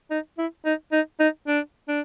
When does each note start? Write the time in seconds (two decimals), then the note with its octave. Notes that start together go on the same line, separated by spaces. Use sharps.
0.11 D#4
0.38 E4
0.65 D#4
0.92 D#4
1.20 D#4
1.47 D4
1.88 D4